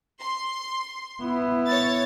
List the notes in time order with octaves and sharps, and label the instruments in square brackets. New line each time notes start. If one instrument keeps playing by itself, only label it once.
[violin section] C6
[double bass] B3 E4
[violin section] C#5 A6